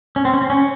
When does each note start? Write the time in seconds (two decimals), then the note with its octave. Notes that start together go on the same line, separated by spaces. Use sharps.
0.16 C#4
0.25 C4
0.34 C#4
0.42 C4
0.50 C#4